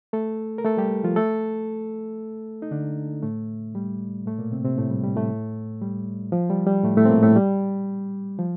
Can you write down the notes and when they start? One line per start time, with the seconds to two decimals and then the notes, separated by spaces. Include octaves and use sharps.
0.13 A3 A4
0.58 A#4
0.65 A3 A4
0.77 G3 G4
1.04 F3 F4
1.16 A3 A4
2.62 D#4
2.71 D3 D4
3.23 A2 A3
3.75 G3
4.26 A2 A3
4.39 A#2 A#3
4.51 C3 C4
4.65 C3 C4
4.78 A2 A3
4.90 G3
5.04 G3
5.16 A2 A3
5.82 G3
6.32 F3
6.50 G3
6.67 G3
6.84 A2 A3
6.97 A2 A3
7.05 C4
7.09 A#2 A#3
7.23 A2 A3
7.36 G3
8.39 F3